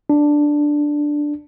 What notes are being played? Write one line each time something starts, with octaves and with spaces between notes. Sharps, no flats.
D4